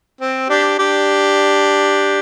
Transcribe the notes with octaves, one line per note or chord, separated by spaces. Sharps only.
C4
D4 G4
D4 G4